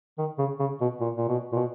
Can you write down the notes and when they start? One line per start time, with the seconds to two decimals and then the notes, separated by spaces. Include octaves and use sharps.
0.18 D#3
0.38 C#3
0.59 C#3
0.81 B2
1.00 A#2
1.17 A#2
1.28 B2
1.52 A#2
1.56 B2